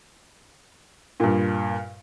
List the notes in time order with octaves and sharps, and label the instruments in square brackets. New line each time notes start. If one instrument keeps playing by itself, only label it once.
[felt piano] G2 A#2